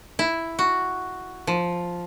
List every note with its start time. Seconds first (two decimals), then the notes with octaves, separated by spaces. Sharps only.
0.19 E4
0.59 F#4
1.47 F3